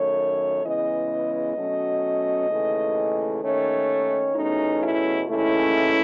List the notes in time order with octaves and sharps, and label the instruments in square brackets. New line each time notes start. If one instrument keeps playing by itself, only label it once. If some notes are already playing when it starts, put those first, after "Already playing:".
Already playing: [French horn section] F#2 D#3 A3 C#5
C#3 E3 G#3 B3 D#5
B2 F#3 A3 C#4
D#2 C#3 E3 A3
D#2 D#3 A3 C#4 C#5
E2 B2 A3 C#4 D#4
E4
D#2 C#3 E3 A3 C#4 E4